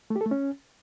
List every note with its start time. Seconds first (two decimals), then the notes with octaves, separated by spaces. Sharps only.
0.10 A3
0.16 G4
0.21 A4
0.26 A3
0.31 C#4